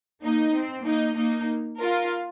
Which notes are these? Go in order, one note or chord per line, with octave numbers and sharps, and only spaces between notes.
A#3 D#4
C4
A#3 D#4
A#3 D#4
F4 A#4